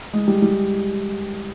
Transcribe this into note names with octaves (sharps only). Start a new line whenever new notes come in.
G#3
G3
G3